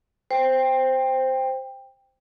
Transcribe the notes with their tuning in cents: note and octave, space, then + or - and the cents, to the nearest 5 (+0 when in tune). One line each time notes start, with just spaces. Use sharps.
C5 +0 G5 +15